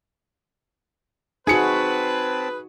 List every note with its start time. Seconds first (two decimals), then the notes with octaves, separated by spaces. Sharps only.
1.47 C4 D#4 F#4 G#4 B4 A5 C#7